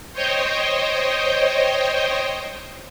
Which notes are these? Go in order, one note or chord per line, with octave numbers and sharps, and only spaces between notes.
C5 C#5 D#5 G5